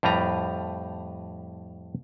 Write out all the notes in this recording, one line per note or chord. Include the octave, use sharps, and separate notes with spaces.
F2 A2 G3 B4 A#5